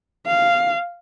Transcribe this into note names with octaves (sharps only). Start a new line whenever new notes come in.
F5